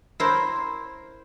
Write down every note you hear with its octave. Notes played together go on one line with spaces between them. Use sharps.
E4 A#4 C5